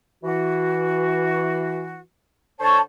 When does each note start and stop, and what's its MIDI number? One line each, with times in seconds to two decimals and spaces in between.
0.24 1.99 52
0.24 1.99 66
2.60 2.77 50
2.60 2.77 72
2.60 2.77 73
2.60 2.78 81
2.60 2.78 85